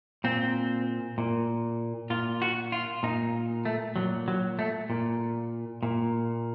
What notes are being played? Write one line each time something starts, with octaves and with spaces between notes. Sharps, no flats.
A#2 C4
A#2
A#2 F4
F#4
F4
A#2 D#4
A3
A#2 F#3
F#3
A3
A#2
A#2